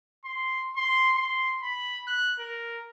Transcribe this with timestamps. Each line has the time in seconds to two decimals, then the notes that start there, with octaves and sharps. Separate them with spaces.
0.25 C6
0.76 C6
1.16 C6
1.62 B5
2.07 F#6
2.40 A#4